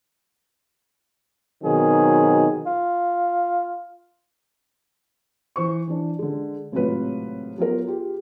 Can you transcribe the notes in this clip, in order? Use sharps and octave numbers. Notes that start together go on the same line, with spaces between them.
B2 D#3 F#3 C4 G#4
F4
E3 C5 C#6
E3 D4
D3 G#3
G#1 A2 C3 F#3 F4 B4
F#3 B3 F4 A#4
F4 G4 G#4